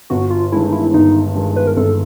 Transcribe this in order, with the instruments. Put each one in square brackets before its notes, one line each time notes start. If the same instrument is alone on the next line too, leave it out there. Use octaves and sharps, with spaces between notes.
[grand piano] G1 [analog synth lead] F#4
[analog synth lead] F4
[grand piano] G2 D#3 G#3 [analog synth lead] E4
[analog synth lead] D#4
E4
[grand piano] G1 [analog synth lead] D#4
[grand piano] G2 D#3 G#3
[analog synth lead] B4
A#4
[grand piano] G1 [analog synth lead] A4